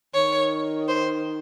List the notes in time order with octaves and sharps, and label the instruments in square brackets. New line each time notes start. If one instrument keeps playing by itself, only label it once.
[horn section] D#3 [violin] C#5
[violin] C5